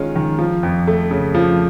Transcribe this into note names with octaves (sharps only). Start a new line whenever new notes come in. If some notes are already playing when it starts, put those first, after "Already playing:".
Already playing: D#3 G#3 C#4 F4
D#3
F3
F2
A3
C#3
F3